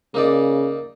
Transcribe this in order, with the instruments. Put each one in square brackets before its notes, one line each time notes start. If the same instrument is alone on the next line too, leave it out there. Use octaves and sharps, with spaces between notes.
[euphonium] C#3 [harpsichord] A#3 D#4 D5